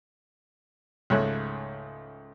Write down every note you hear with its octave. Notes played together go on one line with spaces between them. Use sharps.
C#2 G#2 A3 C#5 E5 F#6